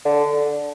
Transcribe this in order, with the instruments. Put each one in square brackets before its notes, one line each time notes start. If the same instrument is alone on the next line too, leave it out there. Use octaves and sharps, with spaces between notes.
[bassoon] D3